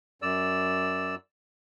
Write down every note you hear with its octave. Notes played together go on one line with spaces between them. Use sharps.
F#2 D5 E6